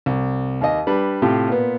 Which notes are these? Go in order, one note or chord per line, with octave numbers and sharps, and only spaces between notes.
C2
D#2 D#5
G3 D4 B4
A2 C3 F4 G4
A#2 B3